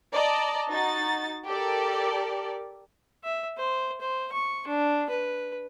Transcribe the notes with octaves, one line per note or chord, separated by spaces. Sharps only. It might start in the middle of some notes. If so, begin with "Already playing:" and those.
D5 D#5 A5 A#5
D#4 F#4 A6
G4 A4 A#4 D5
E5
C5
C5
C#6
D4
B4